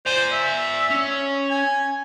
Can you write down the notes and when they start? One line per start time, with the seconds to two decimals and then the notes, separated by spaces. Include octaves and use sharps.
0.06 C5 D5 G#5
0.32 E5
0.90 C#4
1.50 G#5